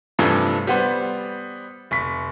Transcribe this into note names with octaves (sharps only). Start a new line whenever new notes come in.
G2 C3 E3 F3 A3
G3 B3 C5
F1 C#6 B6